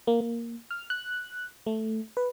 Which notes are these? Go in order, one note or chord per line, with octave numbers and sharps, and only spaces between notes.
A#3
A#3
F6
F#6
A3
B4